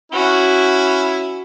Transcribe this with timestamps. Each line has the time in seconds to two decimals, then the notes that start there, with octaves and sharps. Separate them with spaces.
0.12 C#4 E4 F#4